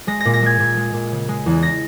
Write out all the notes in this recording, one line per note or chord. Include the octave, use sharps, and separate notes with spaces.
G#3 A#6
A#2 A#6
A#6
G#3 G#6
A#2
G#3
A#2
C#3
G#3
E2
A#6